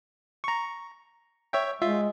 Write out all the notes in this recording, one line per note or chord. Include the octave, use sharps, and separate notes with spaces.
A#5 C#6
C#5 E5 G5
G#3 F4 E5